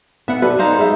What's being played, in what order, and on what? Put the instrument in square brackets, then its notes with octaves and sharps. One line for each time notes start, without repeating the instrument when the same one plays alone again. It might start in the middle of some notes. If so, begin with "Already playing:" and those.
[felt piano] B3 [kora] E5 F#5
[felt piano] A4 D5 [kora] B4
[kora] D#4 C5 F5
[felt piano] G#3 E5